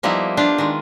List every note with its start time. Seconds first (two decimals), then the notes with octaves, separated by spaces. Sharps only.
0.03 F3 G3 A#3 B3 D#4 E4
0.37 D4 F4 G4
0.58 D#3 G#3